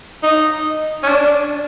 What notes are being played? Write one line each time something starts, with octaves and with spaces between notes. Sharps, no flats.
D#4
C#4
D4